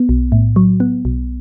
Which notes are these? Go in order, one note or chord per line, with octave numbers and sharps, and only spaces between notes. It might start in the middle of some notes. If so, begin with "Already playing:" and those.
Already playing: B3
B1
A2
F#3
B3
B1